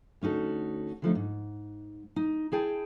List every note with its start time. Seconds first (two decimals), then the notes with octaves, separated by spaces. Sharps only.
0.22 D2 C#4 D#4 F#4 A4
1.02 D3 F3 A3 D#4
1.15 G#2
2.16 D#4
2.52 E4 G#4 G5 A5